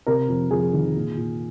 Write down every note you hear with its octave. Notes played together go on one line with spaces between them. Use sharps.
C3 A#4
F2
F2 G#4
D#3
A#2
A#2